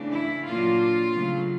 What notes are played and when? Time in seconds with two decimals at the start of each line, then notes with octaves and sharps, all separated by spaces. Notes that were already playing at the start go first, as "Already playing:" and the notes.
Already playing: C#3 E3 A3 D4
0.11 E4
0.44 A#2 F#3 A#3 D4 F4
1.13 C#3 F#3 A3